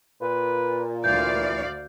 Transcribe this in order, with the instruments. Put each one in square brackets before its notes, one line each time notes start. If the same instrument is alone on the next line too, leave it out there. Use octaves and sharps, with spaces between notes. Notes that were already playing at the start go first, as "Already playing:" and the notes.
[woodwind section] A#2 [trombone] B4
[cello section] D2 D5 F5 [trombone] E3 [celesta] G6